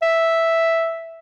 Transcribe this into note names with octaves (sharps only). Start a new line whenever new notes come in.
E5